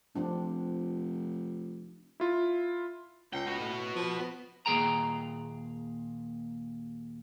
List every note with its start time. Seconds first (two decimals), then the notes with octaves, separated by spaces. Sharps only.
0.16 F1 F3 C4 D4
2.20 E4 F4
3.33 C#2 G5
3.47 F#4 B4
3.60 A2
3.95 F3
4.19 B3
4.66 D#2 A#2 F3 G#4 G5 A#5